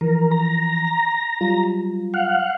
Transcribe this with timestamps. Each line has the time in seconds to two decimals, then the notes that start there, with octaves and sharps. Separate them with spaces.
0.01 E3 F3 A#4
0.31 A#5
1.41 F#3 G3 F4
2.14 F5 F#5